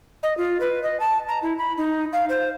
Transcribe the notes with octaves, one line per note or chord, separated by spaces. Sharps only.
D#5
F4
B4
D#5
A5
A#5
E4
B5
D#4
F5
C5